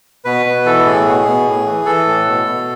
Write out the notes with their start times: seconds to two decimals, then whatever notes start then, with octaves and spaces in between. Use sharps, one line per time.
0.25 B2 B4
0.46 B2
0.65 E3 A4
0.86 A2 G#4
1.06 B2
1.25 B2
1.46 A2
1.66 E3
1.85 E3 A4
2.06 A2
2.26 B2
2.46 B2